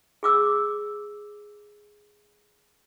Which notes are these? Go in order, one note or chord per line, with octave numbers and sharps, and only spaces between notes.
G#4 D6 E6